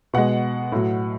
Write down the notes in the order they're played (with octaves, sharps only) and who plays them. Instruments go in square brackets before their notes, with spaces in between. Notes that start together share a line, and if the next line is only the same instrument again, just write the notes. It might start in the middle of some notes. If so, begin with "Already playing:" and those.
[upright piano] B2 G#3 F#5
A2 F#3